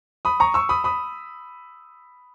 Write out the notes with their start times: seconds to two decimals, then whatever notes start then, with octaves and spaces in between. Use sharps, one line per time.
0.25 B5 D#6
0.40 A#5 C#6
0.54 C#6 E6
0.69 B5 D#6
0.84 B5 D#6